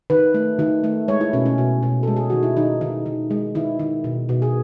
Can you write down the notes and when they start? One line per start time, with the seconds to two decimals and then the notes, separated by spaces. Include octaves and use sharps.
0.10 D#3 B4
0.34 A3
0.59 D#3
0.84 A3
1.08 G#3 C#5
1.21 E4
1.33 B2 C#4
1.46 C#4
1.58 B2
1.83 B2
2.03 G#3 A4
2.16 G#4
2.30 D#3 F#4
2.43 E4
2.56 D#3 D#4
2.81 D#3
3.06 D#3
3.31 G#3
3.55 D#3 E4
3.79 D#3
4.04 B2
4.29 B2
4.42 G#4